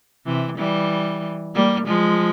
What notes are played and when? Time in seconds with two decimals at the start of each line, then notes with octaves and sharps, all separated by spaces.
0.26 C3 E3
0.58 E3 G3
1.55 G3 A#3
1.87 F3 G#3